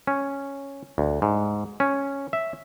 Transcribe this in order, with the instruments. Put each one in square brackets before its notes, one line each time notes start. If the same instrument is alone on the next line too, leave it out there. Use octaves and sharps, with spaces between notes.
[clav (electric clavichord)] C#4
D2
G#2
C#4
E5